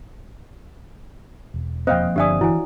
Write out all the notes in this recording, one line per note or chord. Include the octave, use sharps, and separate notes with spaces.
E1
F3 A#3 C4 C5 D#5 F5 G5
G1 D4 G4 D5 E5 G#5 D#6
E3 E4 F#4 G#5